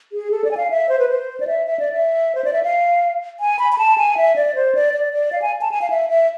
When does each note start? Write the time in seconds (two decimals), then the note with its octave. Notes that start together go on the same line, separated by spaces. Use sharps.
0.12 G#4
0.31 A4
0.44 D5
0.51 G#5
0.57 F5
0.70 E5
0.89 C5
0.99 B4
1.09 C5
1.40 D5
1.47 E5
1.67 E5
1.79 D5
1.93 E5
2.35 C5
2.44 D5
2.53 E5
2.63 F5
3.40 G#5
3.59 B5
3.72 B5
3.78 A5
3.98 G#5
4.17 E5
4.36 D5
4.55 C5
4.75 D5
4.94 D5
5.13 D5
5.32 F5
5.42 G#5
5.61 A5
5.71 G#5
5.82 F5
5.90 E5
6.09 E5